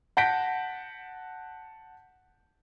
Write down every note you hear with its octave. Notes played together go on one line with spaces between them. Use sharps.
F#5 A5 G6 A#6 B6 D7